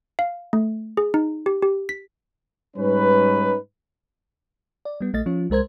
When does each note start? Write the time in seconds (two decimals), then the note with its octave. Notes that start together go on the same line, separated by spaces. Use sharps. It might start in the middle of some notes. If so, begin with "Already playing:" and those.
0.19 F5
0.53 A3
0.97 G#4
1.14 D#4
1.46 G4
1.62 G4
1.89 B6
2.77 G#2 G3 C#4 D#4 B4
4.85 D5
5.01 G3 B3
5.14 A#1 A3 D#5 A6
5.26 F3 C#4 F4
5.50 C2 G#3 A#4 C5 G#6